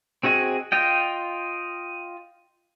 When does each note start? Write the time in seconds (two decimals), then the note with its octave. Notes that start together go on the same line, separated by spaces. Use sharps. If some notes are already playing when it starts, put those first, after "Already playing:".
0.23 C4 F#4 G#4 D#5
0.72 F4 D#5 G5